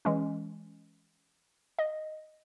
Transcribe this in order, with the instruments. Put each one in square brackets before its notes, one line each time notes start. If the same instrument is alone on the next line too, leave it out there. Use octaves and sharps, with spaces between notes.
[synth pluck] E3 G#3 C#4
D#5